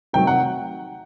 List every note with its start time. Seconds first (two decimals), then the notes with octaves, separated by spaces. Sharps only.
0.13 C3 D#3 F#3 A3 G5
0.27 F#5